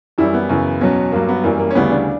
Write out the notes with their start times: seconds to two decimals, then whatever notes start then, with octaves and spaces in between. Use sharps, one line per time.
0.18 F#2 E3 G3 E4
0.34 B3
0.49 F#2 C#3 E3
0.81 E2 B2 F#3 C#4
1.12 G2 F#3 A#3
1.29 B3
1.44 F#2 E3 G3 A#3
1.59 A#3
1.71 C#4
1.75 D2 C#3 E3 G3 B3
1.91 D4